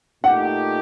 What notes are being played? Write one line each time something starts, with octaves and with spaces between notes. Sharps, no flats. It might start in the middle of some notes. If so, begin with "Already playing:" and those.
A#2 A3 D#4 G4 F#5